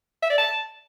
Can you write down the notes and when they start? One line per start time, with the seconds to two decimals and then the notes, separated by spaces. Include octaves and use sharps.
0.22 E5
0.30 D5
0.38 A5